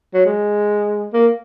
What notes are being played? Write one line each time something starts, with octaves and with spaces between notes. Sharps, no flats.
F#3
G#3
A#3